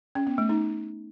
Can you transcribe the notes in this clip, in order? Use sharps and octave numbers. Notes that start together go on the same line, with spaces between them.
C#4
B3
A3
D#4